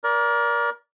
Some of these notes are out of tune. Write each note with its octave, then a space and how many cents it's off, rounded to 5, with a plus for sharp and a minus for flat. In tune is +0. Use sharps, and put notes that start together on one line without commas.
A#4 +25 D5 -20